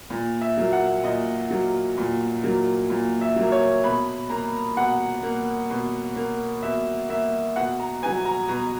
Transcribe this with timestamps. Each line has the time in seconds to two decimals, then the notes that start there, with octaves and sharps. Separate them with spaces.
0.10 A#2
0.41 E5
0.57 F#3 A#3
0.73 F#5
1.04 A#2 D#5
1.50 F#3 A#3
1.98 A#2
2.43 F#3 A#3
2.90 A#2
3.21 E5
3.36 F#3 A#3
3.52 C#5
3.83 B2 B5
4.30 A#3 A#5
4.77 B2 F#5
5.23 A#3
5.70 B2
6.16 A#3
6.63 B2 E5
7.09 A#3 E5
7.56 B2 F#5
7.80 A#5
8.02 B3 G#5
8.06 F#3
8.25 A#5
8.48 B2 A#5